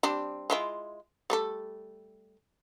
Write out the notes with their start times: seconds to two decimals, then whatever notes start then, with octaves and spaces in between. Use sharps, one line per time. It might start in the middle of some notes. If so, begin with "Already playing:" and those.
0.03 G3 C4 D4
0.50 G#3 E4 F4
1.30 G3 A3 A4